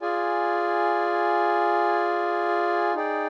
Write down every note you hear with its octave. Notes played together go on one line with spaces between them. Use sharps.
F4 G#4 D5 G#5
D#4 G#4 D5 G5